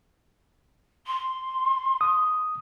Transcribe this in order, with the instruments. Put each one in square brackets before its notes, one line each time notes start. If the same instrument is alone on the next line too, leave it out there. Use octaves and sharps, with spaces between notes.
[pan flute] C6
[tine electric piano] D#6